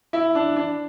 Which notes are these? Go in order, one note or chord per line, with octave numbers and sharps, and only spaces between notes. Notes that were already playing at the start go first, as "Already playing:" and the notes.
E4
D4
D4